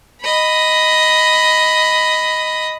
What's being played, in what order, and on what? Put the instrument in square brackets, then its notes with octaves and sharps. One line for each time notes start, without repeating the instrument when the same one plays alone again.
[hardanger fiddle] D#5 B5